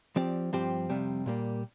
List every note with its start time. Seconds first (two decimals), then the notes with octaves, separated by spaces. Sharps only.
0.16 F3 C4 G4 D5
0.53 G2 F3 C4 G4 C5
0.90 F2 C3 G3
1.26 A#2 G3 A#3